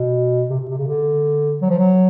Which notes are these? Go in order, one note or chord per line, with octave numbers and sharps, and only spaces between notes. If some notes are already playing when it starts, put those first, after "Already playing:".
Already playing: B2
C3
B2
C3
C#3
D3
F#3
F3
F#3